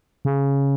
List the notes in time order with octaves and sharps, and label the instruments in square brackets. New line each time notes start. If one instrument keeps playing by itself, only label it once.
[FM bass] C#3